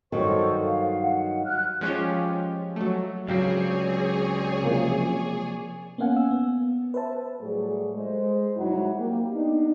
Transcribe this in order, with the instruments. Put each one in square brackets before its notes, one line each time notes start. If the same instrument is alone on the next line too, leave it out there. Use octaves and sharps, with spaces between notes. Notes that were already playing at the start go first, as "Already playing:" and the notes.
[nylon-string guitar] G2 D#3 F#3 [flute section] A4 C5 C#6
[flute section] F5
F#5
F6 F#6
[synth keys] F3 G#3 C#4 F4 G4
F#3 A3
[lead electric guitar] C#2 C4 [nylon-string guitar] F#3 [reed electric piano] G4 F5 [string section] G#4 C#5 D5
[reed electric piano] C3 F3 A#3
[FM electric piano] A#3 B3 C#4 F5 F#5 G#5
E6
B3
B4 C5 E5 A5
[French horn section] A2 F#3 G3 A3 G#4
G#3 C5
G2 C3 F#3 D#4 E4
A#3 G4
B3 D4 D#4